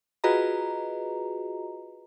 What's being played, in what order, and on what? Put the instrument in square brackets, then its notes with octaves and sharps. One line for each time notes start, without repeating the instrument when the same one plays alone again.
[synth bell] F4 F#4 G#4 B4 D#5 A#5